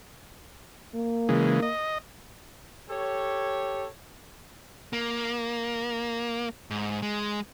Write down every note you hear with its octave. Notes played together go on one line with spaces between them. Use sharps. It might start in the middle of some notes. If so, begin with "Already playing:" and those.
A#3
C#3 E3 G#3
D#5
G4 A4 C#5
A#3
G#2
G#3